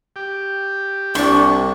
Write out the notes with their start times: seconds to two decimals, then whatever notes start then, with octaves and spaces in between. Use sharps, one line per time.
0.16 G4
1.15 C2 D4 C#6